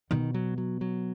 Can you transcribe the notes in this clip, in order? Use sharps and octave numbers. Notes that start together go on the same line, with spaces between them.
B2 D#3
F#3
F#3
F#3